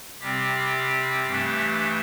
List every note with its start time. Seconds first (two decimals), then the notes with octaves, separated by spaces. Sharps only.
0.20 C3 G3 C4 G4
1.27 G2 E3 A3 D4